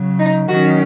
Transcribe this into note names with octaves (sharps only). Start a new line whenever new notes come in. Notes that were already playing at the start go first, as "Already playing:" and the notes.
Already playing: C#3 F#3
D#4
D#3 F#3 C#4 F#4